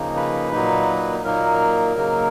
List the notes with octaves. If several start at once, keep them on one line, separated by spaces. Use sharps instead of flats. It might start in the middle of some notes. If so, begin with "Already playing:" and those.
Already playing: C#3 F3 A#3 D#4
B4
A#2 F#3 A#3 D#4
A#2 F#3 A#3 D#4 A#4
C#3 F#3 A#3 D#4